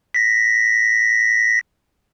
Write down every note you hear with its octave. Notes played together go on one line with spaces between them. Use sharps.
A#6 B6